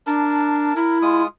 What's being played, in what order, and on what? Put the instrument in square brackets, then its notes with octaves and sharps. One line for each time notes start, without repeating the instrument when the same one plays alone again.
[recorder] D4 [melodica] A#4 A5
[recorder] E4 [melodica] A#4
[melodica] G#3 F4 D#6